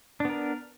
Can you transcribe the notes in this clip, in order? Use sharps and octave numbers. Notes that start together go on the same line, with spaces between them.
B3 D4 A#4